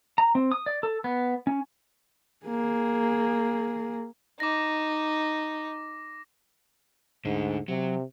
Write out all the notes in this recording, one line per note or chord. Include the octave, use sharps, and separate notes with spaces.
A#5
C4
D#6
D5
A4
B3
C#4
A#3 G#4
D#4 D6 A#6
D2 G#2 D3
C3 F#3